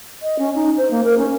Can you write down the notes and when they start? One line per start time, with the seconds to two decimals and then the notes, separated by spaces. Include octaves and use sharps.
0.22 D#5
0.39 C#4
0.55 D#4
0.77 C5
0.91 A#3
1.04 A#4
1.18 C#4